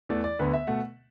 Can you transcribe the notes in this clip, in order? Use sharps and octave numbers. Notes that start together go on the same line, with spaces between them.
E2 E3 A3 D5
D5
D2 D3 B3 B4
E5
B2 A3 F#5